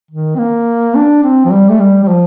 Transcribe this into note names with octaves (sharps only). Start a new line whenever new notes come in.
D#3
C4
A#3
D4
C4
F3
G3
A3
G3
G3
F3